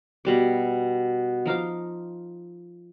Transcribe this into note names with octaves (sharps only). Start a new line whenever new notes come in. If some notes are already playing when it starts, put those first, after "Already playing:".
B2 G3 D6
F3 D#4 F5 D6